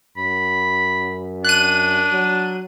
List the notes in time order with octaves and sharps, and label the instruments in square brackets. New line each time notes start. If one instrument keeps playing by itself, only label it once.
[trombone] F#2 [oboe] B5
[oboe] D4 [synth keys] F#6 D#7
[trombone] F#3